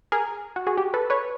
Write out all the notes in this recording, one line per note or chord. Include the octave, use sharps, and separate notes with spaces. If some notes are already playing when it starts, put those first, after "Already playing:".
G#4 A#4
F#4
F#4 G#4
G4
A4 B4
B4 C#5